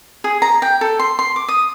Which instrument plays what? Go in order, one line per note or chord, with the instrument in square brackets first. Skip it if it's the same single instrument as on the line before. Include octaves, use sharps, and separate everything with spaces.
[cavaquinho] G#4
A#5
G5
A4
C6
C6
D6
D#6